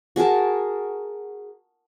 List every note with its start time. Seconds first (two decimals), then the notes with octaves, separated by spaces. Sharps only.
0.16 F#4 G#4 A#4 A5